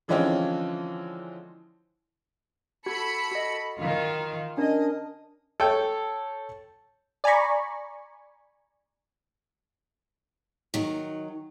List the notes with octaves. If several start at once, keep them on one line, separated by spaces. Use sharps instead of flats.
D3 E3 F3 G#3 C4 C#4
F#4 A4 B5 C#7
F#4 D#5
D#3 F4
C#4 D4 A#4 D#5
A4 C#5 G5
D5 G#5 A#5 B5 C#6
D#3 F#3